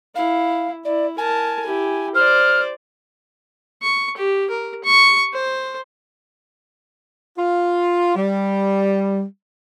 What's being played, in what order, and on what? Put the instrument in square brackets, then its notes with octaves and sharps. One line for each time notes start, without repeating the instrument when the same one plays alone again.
[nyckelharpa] E4 [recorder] F5
[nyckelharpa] E4 [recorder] D5
[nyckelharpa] A#4 A5 [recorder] G#5
[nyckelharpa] E4 G4
[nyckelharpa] C5 D5 [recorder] F6
[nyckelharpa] C#6
G4
A#4
C#6
C5
[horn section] F4
G3